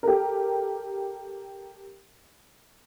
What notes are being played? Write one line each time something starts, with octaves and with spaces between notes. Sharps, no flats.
G4 A4 A#4